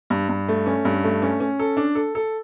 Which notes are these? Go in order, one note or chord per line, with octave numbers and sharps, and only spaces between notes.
G2
G2
A3
C#4
G2
A3
C#4
C#4
A4
D4
A4
A4